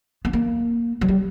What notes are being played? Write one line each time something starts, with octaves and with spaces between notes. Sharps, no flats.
B3
A#3
F#3
G3